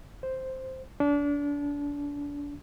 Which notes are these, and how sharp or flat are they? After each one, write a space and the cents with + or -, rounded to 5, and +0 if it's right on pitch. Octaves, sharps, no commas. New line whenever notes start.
C5 +0
D4 -30